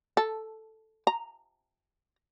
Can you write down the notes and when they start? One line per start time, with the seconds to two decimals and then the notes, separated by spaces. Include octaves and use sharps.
0.17 A4
1.07 A#5